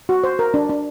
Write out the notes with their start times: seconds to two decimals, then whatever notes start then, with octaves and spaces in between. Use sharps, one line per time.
0.09 F#4
0.24 C5
0.39 A#4
0.54 D4
0.69 D4